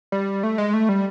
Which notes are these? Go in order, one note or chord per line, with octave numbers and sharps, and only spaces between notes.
G3
A3
G#3
A3
G3